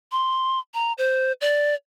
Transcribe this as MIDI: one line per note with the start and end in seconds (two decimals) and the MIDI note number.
0.12 0.59 84
0.74 0.93 82
0.98 1.32 72
1.41 1.75 74